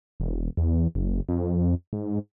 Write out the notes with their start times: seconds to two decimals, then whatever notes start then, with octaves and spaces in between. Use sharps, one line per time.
0.20 E1
0.57 E2
0.95 F#1
1.29 F2
1.93 G#2